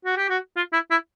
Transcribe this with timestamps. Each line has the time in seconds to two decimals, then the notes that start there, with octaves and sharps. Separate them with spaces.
0.05 F#4
0.17 G4
0.29 F#4
0.56 F4
0.73 E4
0.91 E4